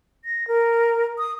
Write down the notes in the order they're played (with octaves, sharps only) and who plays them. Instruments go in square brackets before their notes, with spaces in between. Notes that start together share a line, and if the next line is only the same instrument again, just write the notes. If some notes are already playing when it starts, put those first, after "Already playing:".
[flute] A#6
A#4
D#6